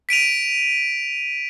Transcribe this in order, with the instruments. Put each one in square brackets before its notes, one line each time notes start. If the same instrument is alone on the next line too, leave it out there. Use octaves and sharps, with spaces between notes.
[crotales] B6 D7 D#7 F7